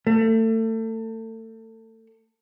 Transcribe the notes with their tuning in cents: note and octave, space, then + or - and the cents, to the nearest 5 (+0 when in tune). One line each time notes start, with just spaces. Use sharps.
A3 +30